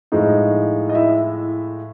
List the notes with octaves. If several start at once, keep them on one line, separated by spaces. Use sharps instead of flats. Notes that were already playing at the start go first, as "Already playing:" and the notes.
A2 F3 G#3 D#4 D#5
D#5
E4 E5